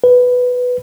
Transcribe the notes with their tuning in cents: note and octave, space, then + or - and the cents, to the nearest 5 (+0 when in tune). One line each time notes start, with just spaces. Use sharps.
B4 +5